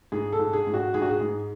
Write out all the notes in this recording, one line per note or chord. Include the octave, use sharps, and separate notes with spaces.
G#2 G#4
A4
G#2
G#4
G#2
F#4
G#2 G#4
F#4
G#4
G#2